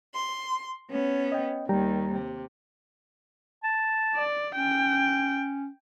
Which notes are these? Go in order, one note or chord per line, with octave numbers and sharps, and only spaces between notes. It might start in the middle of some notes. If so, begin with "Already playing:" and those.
C6
B3 C#4
D#5 G5
D#2 D#3 G3 G5 A#5
C3
A5
D5
C#4 G5